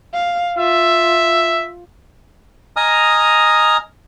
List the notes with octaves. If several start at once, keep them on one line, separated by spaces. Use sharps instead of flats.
F5
F4 E5
D#5 G#5 A#5 D#6 F6